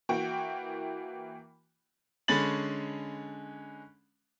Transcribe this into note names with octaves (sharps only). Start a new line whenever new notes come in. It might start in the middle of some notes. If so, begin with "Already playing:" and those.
E3 A#3 F#4 G5
D3 G#3 C#4 B5 A6 F#7